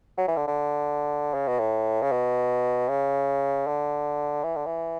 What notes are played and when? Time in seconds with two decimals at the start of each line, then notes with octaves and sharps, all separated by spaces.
0.18 F#3
0.28 E3
0.37 D3
0.48 D3
1.34 C#3
1.48 B2
1.59 A2
2.02 C#3
2.12 B2
2.89 C#3
3.67 D3
4.43 E3
4.56 D3
4.66 E3